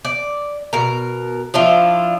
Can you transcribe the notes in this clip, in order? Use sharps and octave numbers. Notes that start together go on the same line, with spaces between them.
D5
B2 A#4
F3 D4 E4 F4